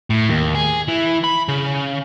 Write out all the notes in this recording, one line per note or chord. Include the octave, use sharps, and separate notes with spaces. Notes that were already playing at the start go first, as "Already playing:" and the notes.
A2
D#2
G#4
E3
B5
C#3